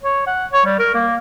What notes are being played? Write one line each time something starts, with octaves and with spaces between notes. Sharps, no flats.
C#5
F#5
C#5
G3
A#4
A#3